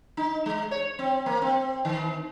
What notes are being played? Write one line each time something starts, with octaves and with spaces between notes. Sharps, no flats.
D#4
G#3
C#5
C4
A#3
C4
D#3